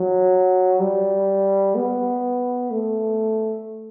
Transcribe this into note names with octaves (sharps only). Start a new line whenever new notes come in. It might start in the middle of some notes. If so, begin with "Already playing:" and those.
Already playing: F#3
G3
B3
A3